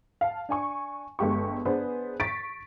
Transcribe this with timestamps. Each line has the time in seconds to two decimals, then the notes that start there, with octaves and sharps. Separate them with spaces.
0.21 F5 A5
0.49 D4 G#5 C#6
1.19 G1 G#3 G4 C#6
1.65 B3 D4 G#4 B4 C5
2.20 C#6 A6 B6 D7